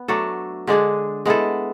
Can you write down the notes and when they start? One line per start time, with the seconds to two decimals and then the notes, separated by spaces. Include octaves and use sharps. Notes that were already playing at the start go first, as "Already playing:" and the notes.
Already playing: B3
0.08 F#3 A3 D4 A4
0.67 D3 G#3 D4 G#4
1.25 G#3 B3 E4 A4